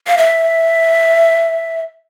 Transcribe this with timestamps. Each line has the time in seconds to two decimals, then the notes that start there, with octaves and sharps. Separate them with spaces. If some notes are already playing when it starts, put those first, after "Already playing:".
0.07 F5
0.17 E5